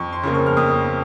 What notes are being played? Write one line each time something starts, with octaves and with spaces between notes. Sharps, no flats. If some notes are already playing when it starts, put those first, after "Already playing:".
Already playing: F2 C#6
C6
C#3 F3 A#3
C#6
F6
F2 D#6